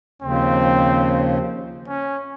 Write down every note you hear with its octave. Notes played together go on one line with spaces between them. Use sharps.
D#2 C#3 F3 C4
C#4